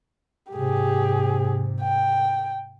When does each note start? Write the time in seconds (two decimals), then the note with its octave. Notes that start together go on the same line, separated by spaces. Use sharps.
0.53 G#2 C3 G4 G#4
1.82 G5